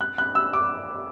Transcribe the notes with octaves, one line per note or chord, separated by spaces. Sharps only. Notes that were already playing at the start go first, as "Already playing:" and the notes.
F#6
F#6
E6
D6